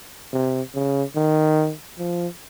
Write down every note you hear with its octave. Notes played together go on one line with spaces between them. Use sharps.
C3
C#3
D#3
F3